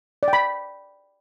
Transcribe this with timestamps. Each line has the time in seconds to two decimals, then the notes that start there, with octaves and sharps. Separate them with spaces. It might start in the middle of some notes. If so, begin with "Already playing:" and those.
0.23 D5
0.28 G5
0.33 B5